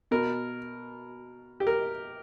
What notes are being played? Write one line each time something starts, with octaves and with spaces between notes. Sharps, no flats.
B2 A#4
G4
A#4